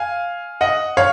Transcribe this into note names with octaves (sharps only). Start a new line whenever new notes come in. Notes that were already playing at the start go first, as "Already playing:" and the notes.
Already playing: F5 G#5
D#5 F#5
C#5 F5